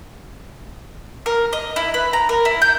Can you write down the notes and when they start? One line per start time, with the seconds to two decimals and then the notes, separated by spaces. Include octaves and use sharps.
1.26 A#4
1.53 D#5
1.76 E4
1.94 B4
2.13 A#5
2.29 A#4
2.45 E4
2.62 G6